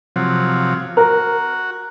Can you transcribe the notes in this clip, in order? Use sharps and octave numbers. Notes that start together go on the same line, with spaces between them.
C3 F3 F#3
F#4 A#4